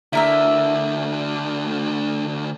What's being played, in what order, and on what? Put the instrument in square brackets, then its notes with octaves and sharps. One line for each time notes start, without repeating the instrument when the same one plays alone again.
[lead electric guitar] D2 D3 [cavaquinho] E4 A#4 E5